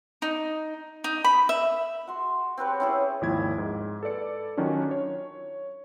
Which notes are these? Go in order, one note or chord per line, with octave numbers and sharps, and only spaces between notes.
D#4
D#4
B5
E5
F#4 C6
C4 G4 B4 C#5
C#4 E4 G#4
G#1 D#2 F3 E4 C#5 G#6
G#2
A4 B4 D5 C#7
D#3 F#3 C#4 D4 F4
C#5